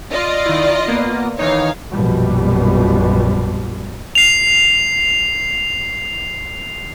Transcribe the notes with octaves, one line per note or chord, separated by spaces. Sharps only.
F4 D5 D#5
D#3 E4
A#3 B3
D#3 E3 D#4 C#5 F5
A#1 F#2 B2 F3 G3
C7 F7